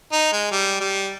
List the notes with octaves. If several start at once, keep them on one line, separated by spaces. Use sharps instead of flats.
D#4
G#3
G3
G3